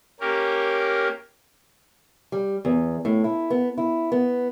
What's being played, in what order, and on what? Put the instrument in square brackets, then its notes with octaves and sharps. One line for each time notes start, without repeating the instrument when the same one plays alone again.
[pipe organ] A#3 C#4 G4 A#4
[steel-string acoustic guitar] G3
E2
A2
E4
B3
E4
B3